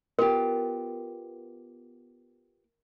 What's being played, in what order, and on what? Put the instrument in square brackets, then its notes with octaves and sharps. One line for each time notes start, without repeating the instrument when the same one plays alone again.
[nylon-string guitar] B3 F4 G4 [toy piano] A#4